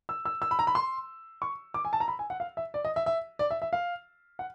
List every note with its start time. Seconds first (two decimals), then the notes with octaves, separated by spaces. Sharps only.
0.09 E6
0.25 E6
0.42 E6
0.51 B5
0.59 A#5
0.67 B5
0.75 C6
1.42 C#6
1.74 D6
1.85 G#5
1.93 A5
2.00 A#5
2.08 B5
2.19 G#5
2.30 F#5
2.40 F5
2.57 E5
2.74 D5
2.85 D#5
2.96 E5
3.06 E5
3.39 D5
3.51 E5
3.62 E5
3.73 F5
4.39 F#5